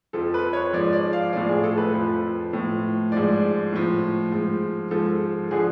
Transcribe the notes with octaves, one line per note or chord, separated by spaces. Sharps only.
F2 F3 A4
B4
C#5
G#2 F3 D5
D5
F5
A2 F3 D5
G#4
A4
B4
F2 F3
A2 F3
G#2 F3 D5
A2 F3
G#2 F3
G#2 F3 A4
D3 F3 G#4